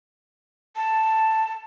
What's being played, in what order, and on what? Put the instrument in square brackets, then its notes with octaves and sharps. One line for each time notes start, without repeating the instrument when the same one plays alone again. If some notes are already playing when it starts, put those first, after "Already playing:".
[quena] A5